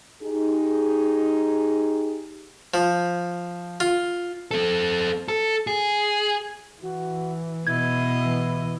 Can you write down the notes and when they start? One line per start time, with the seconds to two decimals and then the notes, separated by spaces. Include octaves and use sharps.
0.22 D#4 G4 G#4
2.74 F3
3.80 F4
4.51 C4 A4
5.28 A4
5.67 G#4
6.82 E3 F#4
7.67 B2 E4 D#5 G#6
8.24 E3